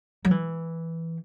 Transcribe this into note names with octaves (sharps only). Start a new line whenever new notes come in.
F#3
E3